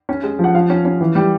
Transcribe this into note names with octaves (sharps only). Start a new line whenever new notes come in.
C#4
G#3
F3
F#5
F3 F5
C#4
C#4
E3
G3